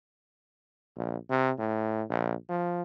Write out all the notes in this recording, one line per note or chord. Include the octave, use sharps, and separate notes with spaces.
A#1
C3
A2
A#1
F3